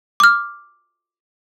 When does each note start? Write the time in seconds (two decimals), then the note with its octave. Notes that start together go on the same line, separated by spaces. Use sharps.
0.20 D6 F6